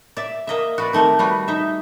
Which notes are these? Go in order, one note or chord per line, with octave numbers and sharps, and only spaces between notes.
D5 E5
A#3 D#5 E5
F#4 B4 D5
D#3 A3 C4 G4 A#4
G3 F#4 B4
D#4 E5